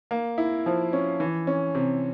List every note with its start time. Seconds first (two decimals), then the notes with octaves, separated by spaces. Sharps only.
0.11 A#3
0.38 E4
0.66 F3
0.93 C#4
1.20 E3
1.47 C#4
1.75 C3